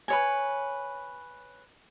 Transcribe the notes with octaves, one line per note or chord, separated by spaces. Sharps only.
B4 C#5 G#5